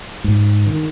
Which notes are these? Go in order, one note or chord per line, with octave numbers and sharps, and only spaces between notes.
G#2
D#3